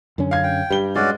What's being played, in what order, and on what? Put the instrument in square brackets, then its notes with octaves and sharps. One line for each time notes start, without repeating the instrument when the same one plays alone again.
[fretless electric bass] F#2 D3 C#4
[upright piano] F5 G#6
[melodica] G5
[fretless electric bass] G2 [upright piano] G3 G7
[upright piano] G#3 [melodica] C#4 F#4 D5